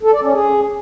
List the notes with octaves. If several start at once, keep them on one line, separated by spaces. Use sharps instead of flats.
A4
D5
C#4
G#4